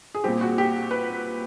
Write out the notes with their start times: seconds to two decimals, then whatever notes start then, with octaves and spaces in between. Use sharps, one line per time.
0.15 G#4
0.24 A#2 G3 C4 G4
0.41 F#4
0.58 G4
0.91 B4